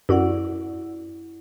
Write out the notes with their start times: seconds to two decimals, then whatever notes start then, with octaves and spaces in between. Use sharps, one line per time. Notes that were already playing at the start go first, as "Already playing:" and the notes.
0.09 F#2 E4 F#4 D5 F#5